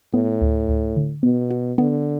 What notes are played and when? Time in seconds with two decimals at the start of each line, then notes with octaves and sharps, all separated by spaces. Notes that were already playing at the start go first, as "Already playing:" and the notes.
0.13 A2 B3
0.41 D2
0.69 D2
0.97 D3
1.23 B2 B3
1.51 F#4
1.78 D3 B3